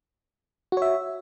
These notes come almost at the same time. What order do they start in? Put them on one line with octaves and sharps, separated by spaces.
F#4 C#5 E5